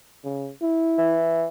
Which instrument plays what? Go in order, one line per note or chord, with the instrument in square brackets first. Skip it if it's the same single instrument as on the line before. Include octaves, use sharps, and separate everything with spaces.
[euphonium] C#3
E4
[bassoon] E3